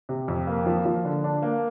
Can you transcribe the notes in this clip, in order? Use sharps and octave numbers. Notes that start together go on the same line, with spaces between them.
C3
F2
A#3
F3
F3
D3
D4
A#3